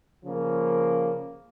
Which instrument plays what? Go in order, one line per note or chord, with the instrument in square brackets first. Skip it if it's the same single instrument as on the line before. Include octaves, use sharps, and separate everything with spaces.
[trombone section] C#3 F3 A#3